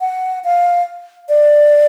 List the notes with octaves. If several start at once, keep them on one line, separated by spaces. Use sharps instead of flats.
F#5
F5
D5